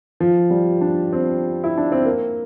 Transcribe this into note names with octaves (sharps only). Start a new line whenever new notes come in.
F3
G3
D4
C4
E4
D4
C4
A#3